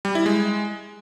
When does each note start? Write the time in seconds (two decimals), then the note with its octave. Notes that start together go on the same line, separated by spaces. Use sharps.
0.05 G3
0.15 E4
0.26 G#3